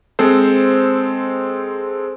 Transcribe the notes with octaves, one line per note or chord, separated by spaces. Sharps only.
G#3 C4 A4 C5